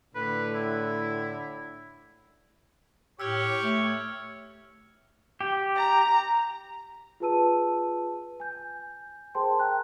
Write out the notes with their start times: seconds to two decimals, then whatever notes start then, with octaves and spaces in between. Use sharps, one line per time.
0.15 A2 D3 B4
0.55 E4
3.20 A2 G4 C#5 E6 F6 C#7
3.62 A3
5.41 G4
5.77 A#5
7.20 F4 G#4 B4 A5 E6 D#7
8.40 G#5 G6
9.35 G#4 A#4 C5 G5 A5 C6
9.59 G5 G#5 A#5 F#6